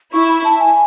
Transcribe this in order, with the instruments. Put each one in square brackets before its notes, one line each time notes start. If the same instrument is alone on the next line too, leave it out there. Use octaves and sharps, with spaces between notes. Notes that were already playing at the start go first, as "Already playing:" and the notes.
[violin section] E4 [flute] C#6
[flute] B5
A5
G#5